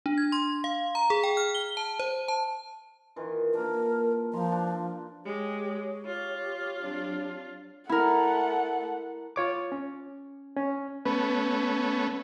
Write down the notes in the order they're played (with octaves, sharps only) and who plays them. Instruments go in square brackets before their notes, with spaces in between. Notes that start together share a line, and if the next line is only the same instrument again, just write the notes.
[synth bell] D4
G#6
C6
F5
A#5
G#4
G5
F6
G7
A5
C5
A5
[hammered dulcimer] D#3 E3 F4
[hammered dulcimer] A#3 D4 [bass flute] A#4
[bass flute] F3 [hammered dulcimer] A#5 C6
[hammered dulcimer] D4
[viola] G#3 [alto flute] G4 [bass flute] C#5
[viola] F4 [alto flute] G4
[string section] F#3 C4 D4
[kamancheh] A3 F#5 [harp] E4 A#4
[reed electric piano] F4 C#5 D6
C#4
C#4
[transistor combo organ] A3 B3 C#4 [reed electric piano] B4